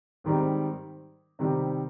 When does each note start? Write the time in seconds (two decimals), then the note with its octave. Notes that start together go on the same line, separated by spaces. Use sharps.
0.24 G#2 D#3 G3 C4
1.39 C3 D#3 G3 C4